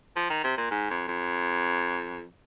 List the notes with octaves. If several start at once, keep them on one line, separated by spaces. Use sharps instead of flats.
F3
D#3
C3
A#2
G#2
F2
F2